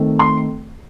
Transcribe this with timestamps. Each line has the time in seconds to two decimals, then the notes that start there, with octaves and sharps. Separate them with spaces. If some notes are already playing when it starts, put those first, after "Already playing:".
Already playing: D#3 A3 C4
0.19 C6